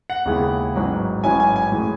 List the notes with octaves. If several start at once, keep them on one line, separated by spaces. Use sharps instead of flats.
F#5
D#2 C#3 G#3 B3 E4
A1 G#2 F#3 C#4 E4
A1 G#2 F#3 C#4 E4 G#5
G#5
G#5
A2 E3 G#3